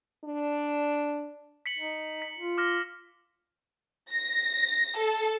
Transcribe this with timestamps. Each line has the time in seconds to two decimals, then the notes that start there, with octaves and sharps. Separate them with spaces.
0.25 D4
1.66 B6 C#7 F#7
1.78 D#4
2.22 B6
2.37 F4
2.58 D6 F6 A#6
4.11 A#6
4.96 A4